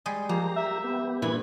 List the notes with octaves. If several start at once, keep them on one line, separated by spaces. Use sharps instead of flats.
G3 G#3 G#4
F3 A#3 G4 A#5
E5
B3 G4
G2 A#2 E3 E4 B5 G#6